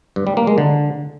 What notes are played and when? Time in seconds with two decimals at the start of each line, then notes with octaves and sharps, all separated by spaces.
0.16 G2
0.27 G3
0.37 A#3
0.47 G#3
0.58 D3